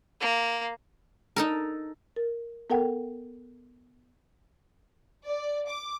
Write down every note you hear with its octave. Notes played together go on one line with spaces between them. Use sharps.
A#3
D#4 A4 A#4
A#4
B3 A4 A#4 F#5 G5
D5
D6